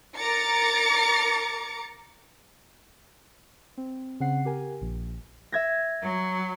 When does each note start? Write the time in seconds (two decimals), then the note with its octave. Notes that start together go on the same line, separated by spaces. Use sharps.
0.17 A#4 A#5 D6 A6 C#7
3.78 C4
4.20 C#3 C4 F#5 C7
4.45 G4 A#4 G#5
4.81 A#1
5.52 E5 G#6 A#6
6.02 F#3